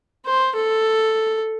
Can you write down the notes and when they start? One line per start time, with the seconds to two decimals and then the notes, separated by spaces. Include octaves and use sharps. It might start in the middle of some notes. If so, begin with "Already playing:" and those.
0.25 C5
0.56 A4